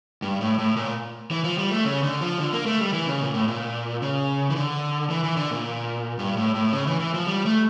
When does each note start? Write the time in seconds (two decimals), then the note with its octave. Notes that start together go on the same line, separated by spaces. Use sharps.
0.22 G2
0.41 A2
0.59 A2
0.76 A#2
1.31 E3
1.44 F3
1.58 G3
1.71 A3
1.84 C#3
2.03 D3
2.21 F3
2.39 D3
2.53 A#3
2.66 A3
2.81 G3
2.93 E3
3.07 C#3
3.21 A#2
3.34 A2
3.48 A#2
4.02 C#3
4.50 E3
4.56 D3
5.10 E3
5.24 E3
5.37 D3
5.51 A#2
6.19 G2
6.37 A2
6.55 A2
6.73 C#3
6.87 E3
7.00 E3
7.14 F3
7.27 G3
7.45 A3